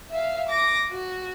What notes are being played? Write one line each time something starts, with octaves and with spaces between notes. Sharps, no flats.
E5 F5
D6 A#6
F#4